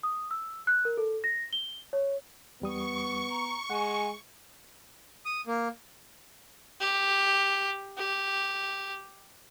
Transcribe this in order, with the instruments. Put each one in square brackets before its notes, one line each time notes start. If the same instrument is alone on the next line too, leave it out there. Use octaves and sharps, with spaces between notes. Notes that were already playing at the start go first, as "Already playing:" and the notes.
[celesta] D#6
E6
F#6
A#4
A4
A#6
G7
C#5
[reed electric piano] E2 G3 D#6 [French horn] B3 [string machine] C#6
[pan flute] A#5
[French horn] G#3 [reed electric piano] F#5 [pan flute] G#5
[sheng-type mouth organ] D#6
A#3
[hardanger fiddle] G4
G4